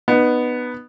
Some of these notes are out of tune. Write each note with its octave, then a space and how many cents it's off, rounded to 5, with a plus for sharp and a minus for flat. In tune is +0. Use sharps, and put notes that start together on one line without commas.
B3 +0 D#4 -30